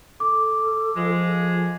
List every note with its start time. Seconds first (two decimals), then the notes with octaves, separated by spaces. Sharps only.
0.20 A4 D6
0.95 F3 G#3